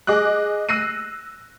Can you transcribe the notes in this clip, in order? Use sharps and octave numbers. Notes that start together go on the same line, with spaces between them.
G#4 D#5 D6 F#6
E6 F#6 A#6 C7 D#7